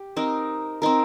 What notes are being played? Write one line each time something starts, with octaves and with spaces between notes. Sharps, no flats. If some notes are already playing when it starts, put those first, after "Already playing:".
Already playing: G4
C4 D#4 A#4
C4 D#4 A#4